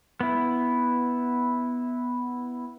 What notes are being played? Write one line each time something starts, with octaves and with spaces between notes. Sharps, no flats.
B3 E4